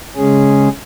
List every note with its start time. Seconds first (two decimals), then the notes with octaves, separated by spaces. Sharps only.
0.16 C#3 G#3 C#4 G#4